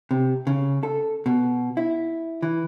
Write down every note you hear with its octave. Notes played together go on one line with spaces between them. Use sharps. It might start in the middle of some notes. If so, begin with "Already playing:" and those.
C3
C#3
A4
B2
E4
E3